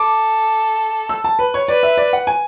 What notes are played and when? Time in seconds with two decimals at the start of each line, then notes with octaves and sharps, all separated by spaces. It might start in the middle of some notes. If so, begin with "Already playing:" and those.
Already playing: A4 D6
1.09 E6
1.24 A5
1.39 B4
1.54 C#5
1.68 B4 D5
1.83 E5
1.97 D5
2.13 F#5
2.27 G#5